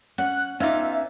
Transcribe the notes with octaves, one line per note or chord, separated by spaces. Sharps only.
C#4 C#5 F#5 F#6
B3 C#4 D#4 F4 E5 F5 D6